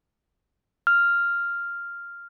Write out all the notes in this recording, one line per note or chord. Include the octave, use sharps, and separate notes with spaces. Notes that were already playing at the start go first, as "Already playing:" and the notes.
F6